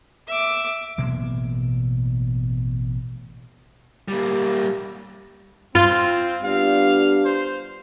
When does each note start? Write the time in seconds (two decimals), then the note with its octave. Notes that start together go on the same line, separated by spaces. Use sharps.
0.27 E5 D6
0.98 A1 B2 F#3 A#3
4.08 G3 A#3
5.75 C4 F4
6.44 G3 B3 D4 F5
7.25 C5